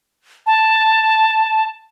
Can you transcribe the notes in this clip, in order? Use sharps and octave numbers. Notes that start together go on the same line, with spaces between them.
A5